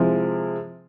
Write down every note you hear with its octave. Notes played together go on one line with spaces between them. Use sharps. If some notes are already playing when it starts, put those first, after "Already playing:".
Already playing: C3 F3 G#3 C4 E4